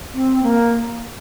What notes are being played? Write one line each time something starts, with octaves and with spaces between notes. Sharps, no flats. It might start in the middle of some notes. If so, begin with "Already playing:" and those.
C4
A#3